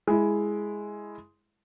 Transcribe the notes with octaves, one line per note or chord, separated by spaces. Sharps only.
G#3 E4